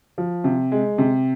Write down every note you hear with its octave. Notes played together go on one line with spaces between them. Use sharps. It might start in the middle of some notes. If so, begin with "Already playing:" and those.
F3
C3
G#3
C3